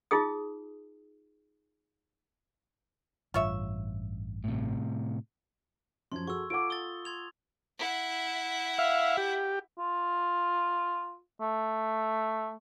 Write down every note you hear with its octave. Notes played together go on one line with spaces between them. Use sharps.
D#4 F4 G#4 D#6
A1 G2 F4 C#5 E5
A2 C3
F#2 F3 C#4 C6 G#6
F#4 G#4 A4 C#6 E6
F4 A4 F#5 D6 D7
D#6 A6 G7
C6 G#6 F7
E4 F#5
E5 F5
G4
F4
A3